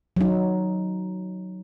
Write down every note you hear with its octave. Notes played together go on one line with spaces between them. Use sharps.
F#3 D#4